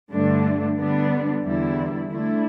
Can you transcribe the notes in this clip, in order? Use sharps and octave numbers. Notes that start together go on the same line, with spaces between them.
G2 D3 A3 D4
D3 G3 B3 D4
E2 D3 G3 E4
D3 A3 E4